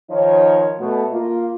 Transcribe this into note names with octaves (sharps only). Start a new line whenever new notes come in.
D#3 F3 D#4 C#5
B2 A3
A#3 F4